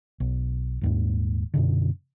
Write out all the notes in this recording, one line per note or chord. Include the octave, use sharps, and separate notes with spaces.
B1
D#1 D#2 G#2
F#2 B2 D3